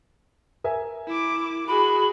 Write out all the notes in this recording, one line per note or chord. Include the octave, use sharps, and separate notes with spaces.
A#4 E5 G#5
E4 D6
F#4 G#4 B5